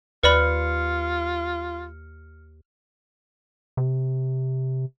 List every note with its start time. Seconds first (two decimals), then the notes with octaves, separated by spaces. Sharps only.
0.23 D#2 F4 B4 D5 B5 F6 C#7
3.77 C3